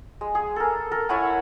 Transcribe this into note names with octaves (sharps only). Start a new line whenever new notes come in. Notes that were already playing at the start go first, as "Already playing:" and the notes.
G#3
G#4
A4 A#4
A4 A#4
E4 C#5 F#5 G#5